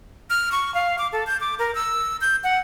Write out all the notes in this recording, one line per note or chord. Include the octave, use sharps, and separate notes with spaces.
F6
C#6
F5
D6
A4
G6
D6
A#4
E6
G6
F#5